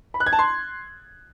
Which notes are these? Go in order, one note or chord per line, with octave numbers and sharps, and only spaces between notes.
B5
F#6
G#6
A5
C6